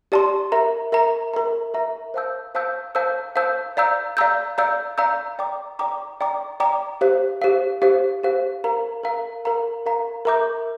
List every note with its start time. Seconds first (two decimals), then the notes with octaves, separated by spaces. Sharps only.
0.12 G4 D5 A5 C6
0.52 A#4 E5 A#5
0.92 A#4 E5 A#5
1.34 A#4 E5 A#5
1.74 A#4 E5 A#5
2.14 C5 F5 A5 E6 G6
2.55 C5 F5 A5 E6 G6
2.95 C5 F5 A5 E6 G6
3.36 C5 F5 A5 E6 G6
3.77 D5 F5 A#5 E6 G6
4.17 D5 F5 A#5 E6 G6
4.58 D5 F5 A#5 E6 G6
4.98 D5 F5 A#5 E6 G6
5.39 D5 G5 A#5 D6
5.79 D5 G5 A#5 D6
6.21 D5 G5 A#5 D6
6.60 D5 G5 A#5 D6
7.01 G4 C5 F5
7.42 G4 C5 F5
7.82 G4 C5 F5
8.23 G4 C5 F5
8.64 A#4 F5 A#5
9.03 A#4 F5 A#5
9.45 A#4 F5 A#5
9.86 A#4 F5 A#5
10.25 A#4 E5 A#5 D6 G6